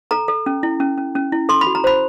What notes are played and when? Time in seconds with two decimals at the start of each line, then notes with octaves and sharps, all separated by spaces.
0.11 A4 A#5
0.28 A4
0.46 C#4
0.63 E4
0.80 C#4
0.98 C#4
1.15 C#4
1.32 E4
1.49 A4 C6
1.61 B5
1.67 F#4
1.75 A#5
1.84 C5 B5